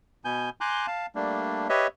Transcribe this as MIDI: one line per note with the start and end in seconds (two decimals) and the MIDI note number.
0.25 0.50 47
0.25 0.50 59
0.25 0.50 80
0.25 0.50 91
0.61 0.87 80
0.61 0.87 82
0.61 0.87 84
0.61 0.87 86
0.61 0.87 90
0.61 0.87 91
0.87 1.06 77
0.87 1.06 81
1.15 1.68 55
1.15 1.68 57
1.15 1.68 58
1.15 1.68 62
1.69 1.87 67
1.69 1.87 71
1.69 1.87 73
1.69 1.87 75
1.69 1.87 76